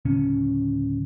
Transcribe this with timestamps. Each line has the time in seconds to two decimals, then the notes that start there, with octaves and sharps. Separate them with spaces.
0.05 D1 C#3 C#4